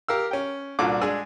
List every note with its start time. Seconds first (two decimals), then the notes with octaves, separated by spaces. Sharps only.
0.08 G4 A#4 F5 E6
0.31 C#4 G5
0.79 C2 A#2 D4 F#4 A4 D6
1.01 G#3 D4 G#5 E6